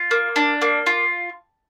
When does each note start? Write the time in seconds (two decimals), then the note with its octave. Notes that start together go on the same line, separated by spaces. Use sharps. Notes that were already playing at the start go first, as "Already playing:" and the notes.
Already playing: F4
0.11 A#3
0.36 D4
0.62 A#3
0.86 F4